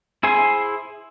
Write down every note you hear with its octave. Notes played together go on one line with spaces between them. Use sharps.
E4 G#4 C5 G#5 C6